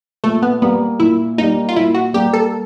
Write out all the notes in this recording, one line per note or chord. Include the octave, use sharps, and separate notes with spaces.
A#2 A3
B3
G3 A#3 B3
A#2 E4
G3 A#3 D#4
F4
A#2 E4
F#4
G3 A#3 G4
A4